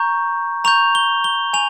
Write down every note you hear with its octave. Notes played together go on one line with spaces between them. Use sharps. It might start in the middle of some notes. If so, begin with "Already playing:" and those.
Already playing: A#5 C#6 G6
A#5 C#6 G6 F7
G7
G7
G#5 F7